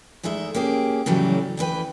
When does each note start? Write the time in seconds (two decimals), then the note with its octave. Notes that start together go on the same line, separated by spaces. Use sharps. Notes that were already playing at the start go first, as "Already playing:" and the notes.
0.23 E2 G#3 A3 D#4 E5
0.54 A#3 C#4 G4 G#4
1.06 A2 C#3 E3 F#3 G3 A3
1.57 D2 E3 B4 G5